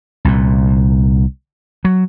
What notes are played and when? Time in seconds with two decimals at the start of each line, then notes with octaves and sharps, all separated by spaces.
0.25 C2 A#2
1.85 F#3